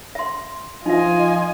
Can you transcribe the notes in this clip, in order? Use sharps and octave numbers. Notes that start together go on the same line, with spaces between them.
E5 C6
F3 D#4 F4 D#5 E5 G#5